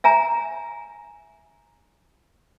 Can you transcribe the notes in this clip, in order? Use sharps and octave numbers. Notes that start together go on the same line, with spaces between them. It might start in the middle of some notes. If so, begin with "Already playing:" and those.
E5 G#5 A#5